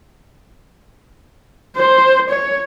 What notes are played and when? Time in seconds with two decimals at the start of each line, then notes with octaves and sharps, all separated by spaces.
1.76 C5
2.30 C#5